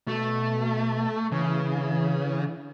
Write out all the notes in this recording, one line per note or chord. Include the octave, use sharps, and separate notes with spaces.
B2 A3
C#3 E3